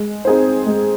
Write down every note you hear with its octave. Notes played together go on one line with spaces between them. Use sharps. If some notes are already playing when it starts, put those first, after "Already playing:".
Already playing: G#3
C4 D#4 G#4 C5
G#3